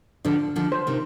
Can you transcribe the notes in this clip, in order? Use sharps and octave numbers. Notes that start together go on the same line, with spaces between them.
D3 F3 D4
D3 F3
C5
C3 D#3